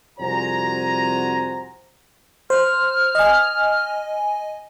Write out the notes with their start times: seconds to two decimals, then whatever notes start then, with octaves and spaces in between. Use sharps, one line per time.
0.19 C2 F2 F#4 C5 G#5 A#5
2.50 C5 F6
3.15 D#5 G#5